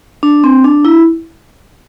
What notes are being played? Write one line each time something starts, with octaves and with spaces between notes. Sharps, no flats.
D4
C4
D4
E4